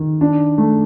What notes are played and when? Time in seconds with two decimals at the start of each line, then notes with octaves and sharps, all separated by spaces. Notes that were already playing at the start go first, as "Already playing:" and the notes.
Already playing: D#3
0.21 D4
0.58 A3